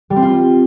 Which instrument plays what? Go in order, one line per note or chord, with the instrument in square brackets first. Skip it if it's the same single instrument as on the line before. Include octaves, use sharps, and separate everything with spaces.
[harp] G3
C4
F4